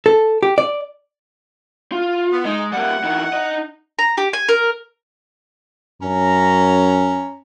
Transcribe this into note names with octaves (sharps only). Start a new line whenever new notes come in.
A4
G4
D5
F4
B3
G#3 D#4
G3 A#3 F#5
E3 D#4
D#4 D#5
A#5
G4
G#5
A#4
F#2 C#4 A#5